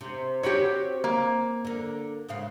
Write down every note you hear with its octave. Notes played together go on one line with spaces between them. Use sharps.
C3
C4 F#4 G4 B4 C#5
A#3
D3 A#4
G#2 C#3 F5